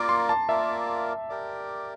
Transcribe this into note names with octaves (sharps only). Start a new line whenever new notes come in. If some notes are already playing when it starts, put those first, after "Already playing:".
Already playing: A#3 F4 A#4 D5 A#5 D6
C6
A5
A#3 F4 A#4 D5 E5
G4 A#4 D5